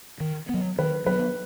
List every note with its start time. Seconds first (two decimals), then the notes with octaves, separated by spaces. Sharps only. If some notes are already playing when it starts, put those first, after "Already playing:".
0.20 D#3
0.49 F#3 B3
0.79 D#3 B4
1.06 F#3 B3 B4